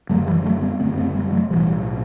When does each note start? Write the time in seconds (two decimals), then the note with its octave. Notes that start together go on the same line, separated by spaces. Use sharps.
0.09 F#1 F#2 D3 F#3 A3
0.27 E3 G3
0.44 F#3 A3
0.62 G3 B3
0.80 F#1 F#2 D3 A3 C4
0.98 A3 C4
1.15 G3 B3
1.32 F#3 A3
1.50 B1 A2 E3 G3